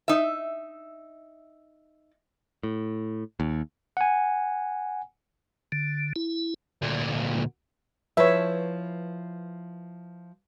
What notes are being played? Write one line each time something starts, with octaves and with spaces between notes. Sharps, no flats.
D#4 E5
A2
D#2
F#5 G#5
D3
E4
D2 A#2
F3 E4 B4 C#5 E5